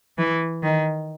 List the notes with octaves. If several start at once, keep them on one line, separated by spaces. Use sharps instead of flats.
E3
D#3